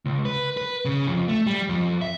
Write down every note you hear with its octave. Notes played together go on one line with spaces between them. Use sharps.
C#2
B4
B4
C#3
F2
A3
G3
F2
E5